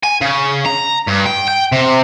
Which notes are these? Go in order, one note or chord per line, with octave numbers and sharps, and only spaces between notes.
G#5
C#3
A#5
G2
G5
G5
C3